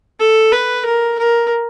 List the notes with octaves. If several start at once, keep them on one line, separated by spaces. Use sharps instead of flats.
A4
B4
A#4
A#4